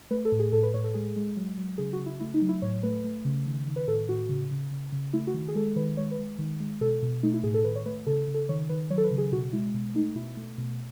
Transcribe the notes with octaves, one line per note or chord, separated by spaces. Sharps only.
A3 B4
A4
A2
G#4
A2 A4
B4
A2 C#5
A4
G#3 G#4
G#3
F#3
F#3
C#3 G#4
F#4
C#3
E4
A3 E4
D#4
F#3
E4
A2 C#5
A3 B4
A3
C#3
D#3
D#3
B4
A2 A4
A2 F#4
C#3
C#3
C#3
C#3
A3 E4
F#4
D#3
G#4
G#3 A4
D#3 B4
G#3 C#5
B4
G#3
D#3
G#3
B2 A4
B2
A3 D#4
E4
A2 G#4
A4
D#3 B4
C#5
A3 B4
C#3 A4
C#3
A4
D#3 C#5
D#3 B4
F#3 C#5
A4
B4
C#3
G#4
B2 F#4
G#3 E4
B2
A3 D#4
B2 E4
A3
B2